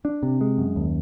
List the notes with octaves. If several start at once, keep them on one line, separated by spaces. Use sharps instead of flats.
D4
C3
G#3
F#2
D#2